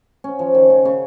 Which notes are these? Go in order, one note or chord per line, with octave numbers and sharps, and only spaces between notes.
C#4
F3
D#3
C#3
C#3